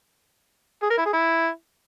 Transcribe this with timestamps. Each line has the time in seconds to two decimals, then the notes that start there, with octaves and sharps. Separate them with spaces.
0.83 G#4
0.90 A#4
0.98 E4
1.06 G#4
1.13 E4